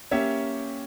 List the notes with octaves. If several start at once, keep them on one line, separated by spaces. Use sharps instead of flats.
A#3 C#4 G4 C#5 E5